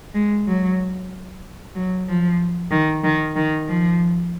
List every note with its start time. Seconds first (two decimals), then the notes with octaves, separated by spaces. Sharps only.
0.14 G#3
0.48 F#3
1.75 F#3
2.08 F3
2.71 D#3
3.04 D#3
3.36 D#3
3.68 F3